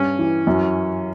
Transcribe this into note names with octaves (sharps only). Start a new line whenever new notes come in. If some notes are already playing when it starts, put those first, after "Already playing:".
Already playing: G2 C#4
E3
F#2